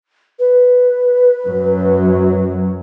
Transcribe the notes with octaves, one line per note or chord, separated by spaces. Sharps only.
B4
F#2 F#3